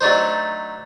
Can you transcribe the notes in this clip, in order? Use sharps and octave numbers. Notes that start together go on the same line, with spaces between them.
F#3 A3 D4 D#4 C5